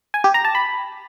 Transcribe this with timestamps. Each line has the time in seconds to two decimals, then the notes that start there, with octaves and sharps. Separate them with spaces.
0.14 G#5
0.24 G4
0.34 A#5
0.45 A5
0.55 B5